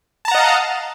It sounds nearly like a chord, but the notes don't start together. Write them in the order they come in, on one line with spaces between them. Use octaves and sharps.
A5 A#5 F#5 D#5 F5